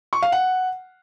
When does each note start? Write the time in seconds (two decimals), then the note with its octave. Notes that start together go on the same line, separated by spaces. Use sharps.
0.13 C#6
0.22 F5
0.32 F#5